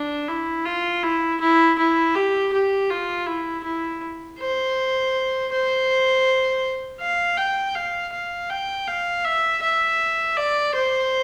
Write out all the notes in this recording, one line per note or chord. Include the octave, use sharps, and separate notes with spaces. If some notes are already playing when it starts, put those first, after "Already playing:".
Already playing: D4
E4
F4
E4
E4
E4
G4
G4
F4
E4
E4
C5
C5
F5
G5
F5
F5
G5
F5
E5
E5
D5
C5